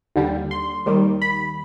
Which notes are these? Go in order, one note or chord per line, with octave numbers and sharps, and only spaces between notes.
D#2 D3 G3
C6
D#2 D#3 G3
B5